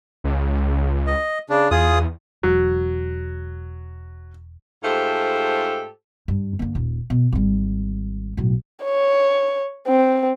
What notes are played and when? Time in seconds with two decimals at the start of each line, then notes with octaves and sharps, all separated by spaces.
0.24 C#2
1.07 D#5
1.50 C#3 D4
1.71 E2 F4 G#4 D#6
2.43 E1 F#3
4.83 G#2 A3 F4 G4 A4 C5
6.28 G2
6.59 D3 A#3
6.75 D#1
7.10 B2
7.33 G#1 G3
8.37 B1 A2
8.84 C#5
9.87 C4